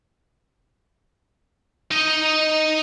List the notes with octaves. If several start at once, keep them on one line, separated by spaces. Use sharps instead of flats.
D#4 D#5